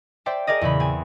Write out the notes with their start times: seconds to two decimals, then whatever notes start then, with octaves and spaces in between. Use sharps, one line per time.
0.26 C5 D5 E5 G5 A5
0.47 G#4 A#4 D5 D#5
0.61 E2 A#2 C#3 B5
0.80 C4 G#5